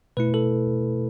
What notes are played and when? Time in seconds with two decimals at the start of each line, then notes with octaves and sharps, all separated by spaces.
0.17 B2 A3 E4 B4
0.34 A4